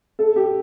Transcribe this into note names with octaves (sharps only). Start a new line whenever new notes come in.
A4
G4